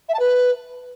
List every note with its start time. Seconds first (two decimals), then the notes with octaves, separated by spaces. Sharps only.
0.08 E5
0.14 A5
0.19 B4